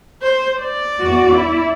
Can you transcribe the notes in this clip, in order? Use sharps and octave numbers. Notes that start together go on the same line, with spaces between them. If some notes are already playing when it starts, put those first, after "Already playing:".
C5
D5
E2 F#4
E4